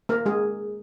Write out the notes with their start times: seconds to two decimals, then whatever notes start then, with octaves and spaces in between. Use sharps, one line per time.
0.09 A#3 A#4
0.26 G#3 G#4